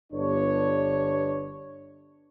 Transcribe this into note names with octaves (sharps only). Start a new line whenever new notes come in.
G1 D4 C#5